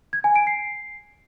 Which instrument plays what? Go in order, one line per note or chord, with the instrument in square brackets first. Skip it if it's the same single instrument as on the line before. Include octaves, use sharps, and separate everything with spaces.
[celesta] G#6
G#5
D7
C7